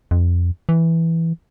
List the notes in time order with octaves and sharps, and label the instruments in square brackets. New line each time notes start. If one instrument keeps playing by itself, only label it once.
[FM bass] F2
E3